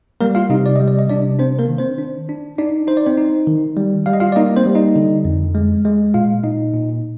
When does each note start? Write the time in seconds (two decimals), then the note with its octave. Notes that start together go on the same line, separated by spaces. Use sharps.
0.21 G3 A#3 A#4
0.35 F4 F5
0.50 C3 D#4 D#5
0.66 D5
0.76 G3 D#5
0.88 D5
0.99 D#5
1.09 C3 D4 D5
1.39 C4 D4 C5
1.59 A#3 A#4
1.68 D#3
1.78 C4 C5
1.98 D4
2.29 D4
2.58 D4 D#4 D5
2.87 D#4 C5
2.97 D5
3.06 C4 C5
3.17 D#4
3.47 D#3
3.77 G3
4.06 G3 F5
4.13 D#5
4.20 F4 F5
4.32 D5
4.36 A#3 D#4 D#5
4.56 C4 C5
4.66 G3
4.75 D#4 D#5
4.96 D3
5.25 F2
5.55 G#3
5.85 G#3
6.14 A#2 F4 F5
6.43 A#2 D#4 D#5
6.74 A#2